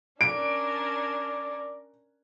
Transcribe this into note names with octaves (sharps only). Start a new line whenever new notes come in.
C#4 D4 A#4 D5 D7